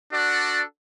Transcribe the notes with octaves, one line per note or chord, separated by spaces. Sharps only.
D4 F#4 A4 D5 F#5